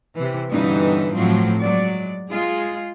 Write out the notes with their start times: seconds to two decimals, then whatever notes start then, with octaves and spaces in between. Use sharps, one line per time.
0.15 C3 E3
0.50 G2 B2 D3 E3 C#4 D#4
1.14 A2 F3 F#3 C4
1.61 F#3 G#3 D5
2.30 G#3 F4 G#4